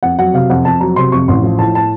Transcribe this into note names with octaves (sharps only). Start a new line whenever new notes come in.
F2 F#5
F#3 F#5
C3 F5
F2 F#5
F2 A5
F#3 A#5
C3 C6
F2 C#6
A1 C6
F3
A2 A5
A5